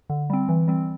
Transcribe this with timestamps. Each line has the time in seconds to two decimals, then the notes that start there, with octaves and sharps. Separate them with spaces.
0.10 D3
0.30 G3 C4
0.49 E3
0.68 G3 C4